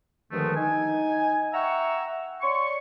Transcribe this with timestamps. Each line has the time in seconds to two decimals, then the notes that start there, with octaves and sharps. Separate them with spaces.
0.31 G2 D3 D#3 F3 G#3 A3
0.56 D#4 G#5
1.53 E5 F#5 G5 A#5 C#6 E6
2.41 C#5 D5 C6 C#6